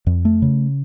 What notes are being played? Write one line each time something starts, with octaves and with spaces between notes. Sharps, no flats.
F2
A3
C#3